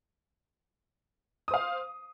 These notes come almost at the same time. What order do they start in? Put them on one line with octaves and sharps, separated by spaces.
D#6 C5 F5